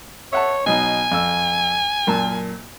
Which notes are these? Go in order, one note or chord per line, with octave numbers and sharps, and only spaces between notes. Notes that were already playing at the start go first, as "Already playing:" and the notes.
C#5 E5 F#5 A5
B2 F#3 D#4 G#5
F2 E6
F#2 A#2 A5